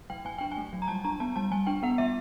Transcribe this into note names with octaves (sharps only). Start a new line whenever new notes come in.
F#3 G5
F#3 G#5
D4 G5
G#5
A3
F#3
A#5
G3 A5
D4 A#5
B3 A5
G3 A5
G3 G#5
D4 G5
B3 F#5
G3 E5